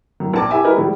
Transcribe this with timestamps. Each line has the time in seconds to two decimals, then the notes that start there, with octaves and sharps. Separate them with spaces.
0.20 F#2 A2
0.34 A#1 A5 D6
0.50 E4 G4 E5 G#5 D6
0.64 G3 E4 G#4 A#4 B4 D#5
0.77 A2 F3 G3 G#3